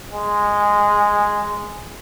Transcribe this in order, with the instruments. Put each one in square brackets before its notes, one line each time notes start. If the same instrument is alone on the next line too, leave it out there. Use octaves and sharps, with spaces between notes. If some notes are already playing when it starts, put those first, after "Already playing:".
[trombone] G#3